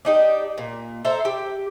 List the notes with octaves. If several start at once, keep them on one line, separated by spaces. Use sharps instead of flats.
D4 D#4 G4
A#2
A4 C5 E5 A#5
G4